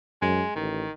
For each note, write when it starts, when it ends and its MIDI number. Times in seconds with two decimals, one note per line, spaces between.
0.22 0.43 42
0.22 0.50 56
0.55 0.84 33
0.55 0.91 51